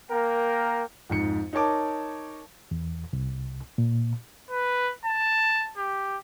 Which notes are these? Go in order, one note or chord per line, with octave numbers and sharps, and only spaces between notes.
A#3 A#4 G5
F2 G#2 C#7
D#4 A#4 C#5 A5 D6
E2
C2
A#2
B4
A5
G4